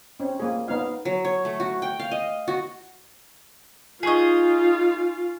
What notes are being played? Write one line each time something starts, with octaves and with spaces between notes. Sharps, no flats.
C4 C#4
A#3 G#4
B3 D#4 F5
F#3
C#5
A3
F#4
G5
F5
D#5
F#4
D#4 F4 G#4 D#5 G#5 C#6